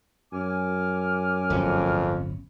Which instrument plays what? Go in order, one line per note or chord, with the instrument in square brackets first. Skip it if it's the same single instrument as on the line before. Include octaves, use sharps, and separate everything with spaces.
[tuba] F#2 [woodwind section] G#5 D6 F6
[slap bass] D1 G1 C#4 [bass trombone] F2